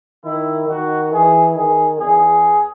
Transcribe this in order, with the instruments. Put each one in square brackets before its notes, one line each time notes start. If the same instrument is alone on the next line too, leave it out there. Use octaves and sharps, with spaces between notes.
[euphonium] D#3 [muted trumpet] E4
[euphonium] D#3 [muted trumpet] F#4
[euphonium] E3 [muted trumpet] G#4
[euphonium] D#3 [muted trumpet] G#4
[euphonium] E2 [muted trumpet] G#4